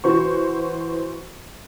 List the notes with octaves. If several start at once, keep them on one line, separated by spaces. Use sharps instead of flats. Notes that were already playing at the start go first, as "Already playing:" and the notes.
E3 F#4 C5 C#6